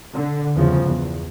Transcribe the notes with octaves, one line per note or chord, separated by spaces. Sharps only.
D3
E2 G2 C#3 F3
E2